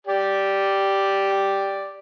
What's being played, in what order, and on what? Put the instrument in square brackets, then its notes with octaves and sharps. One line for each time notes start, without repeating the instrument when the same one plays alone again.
[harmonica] G4 D5